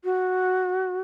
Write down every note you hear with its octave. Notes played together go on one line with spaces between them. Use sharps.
F#4